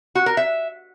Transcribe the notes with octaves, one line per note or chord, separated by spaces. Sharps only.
F#4
A#4
E5